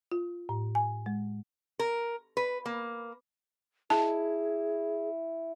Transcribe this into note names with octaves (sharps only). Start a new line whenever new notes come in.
F4
A2
G#5
G#3
A#4
B4
A#3
E4 G#4 A5